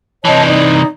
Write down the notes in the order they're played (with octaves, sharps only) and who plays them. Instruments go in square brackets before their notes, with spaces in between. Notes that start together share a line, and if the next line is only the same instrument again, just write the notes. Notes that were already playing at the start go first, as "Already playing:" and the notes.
[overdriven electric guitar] C3 E3 [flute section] C#5 D#5 A5
[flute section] D#4 D5